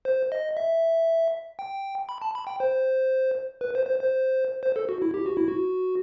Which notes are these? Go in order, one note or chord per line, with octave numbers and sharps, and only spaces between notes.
C5
D#5
E5
G5
B5
A5
B5
G5
C5
B4
C5
C5
C5
C5
A4
F#4
E4
G4
F#4
E4
F#4